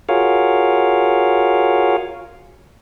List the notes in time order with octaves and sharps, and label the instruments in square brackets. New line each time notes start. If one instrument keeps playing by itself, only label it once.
[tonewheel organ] F4 F#4 G#4 A#4 C#5 F5